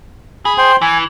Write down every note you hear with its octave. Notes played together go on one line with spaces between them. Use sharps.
G#4 B5
C5 G5 C6
E3 G#5